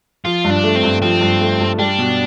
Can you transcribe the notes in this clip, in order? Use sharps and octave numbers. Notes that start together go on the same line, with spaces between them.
F3 F4
G2
D4
A3
C4
G2
F3 C4
G2
A3
G2
G3 D4
B2